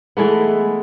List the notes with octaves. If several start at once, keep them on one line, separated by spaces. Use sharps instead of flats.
E3 G#3 A3 B3